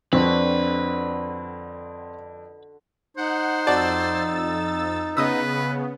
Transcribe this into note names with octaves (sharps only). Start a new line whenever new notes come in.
F2 D3 C4 F#4 B4 C#6
D#4 C5 F#5
F2 F#4 D5 A5 E6 A6
C#3 B3 B4 D#5 D#6 E6